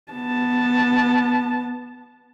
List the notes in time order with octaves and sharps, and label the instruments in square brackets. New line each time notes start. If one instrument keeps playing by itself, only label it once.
[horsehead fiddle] B3 A5